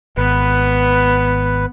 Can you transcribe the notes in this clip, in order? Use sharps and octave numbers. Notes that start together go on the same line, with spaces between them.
G#1 B3 B4